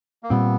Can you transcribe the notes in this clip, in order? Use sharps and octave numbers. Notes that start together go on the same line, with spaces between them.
A#3
A#2 G3 B3 C4